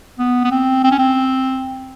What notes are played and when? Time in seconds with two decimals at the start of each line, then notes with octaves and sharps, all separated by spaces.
0.19 B3
0.44 B3
0.51 C4
0.84 C4
0.91 C#4
0.99 C4